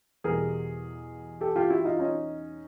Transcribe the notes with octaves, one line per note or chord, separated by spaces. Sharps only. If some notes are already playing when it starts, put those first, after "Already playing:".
E2 B2 G3 G#4 A#4
G4 A4
F4 G4
E4 F#4
D#4 F4
C#4 D#4